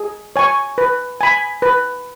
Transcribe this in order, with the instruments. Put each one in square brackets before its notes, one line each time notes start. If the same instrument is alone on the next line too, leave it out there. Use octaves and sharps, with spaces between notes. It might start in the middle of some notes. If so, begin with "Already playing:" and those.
Already playing: [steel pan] G#4
C#5 G#5 C#6
B4
G#5 B5
B4